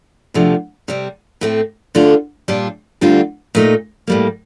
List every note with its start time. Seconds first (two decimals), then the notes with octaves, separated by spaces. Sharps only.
0.34 D2 C3 F3 A3 D4
0.88 C3 G3 C4
1.41 A2 A3 C4
1.95 D3 A3 D4 F4
2.48 A#2 G3 D4 F4
3.01 D2 D3 G3 C4 F4
3.55 A#2 A3 D#4
4.07 A2 G3 A#3